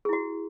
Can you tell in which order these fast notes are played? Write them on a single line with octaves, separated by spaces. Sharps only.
G#4 E4 F#4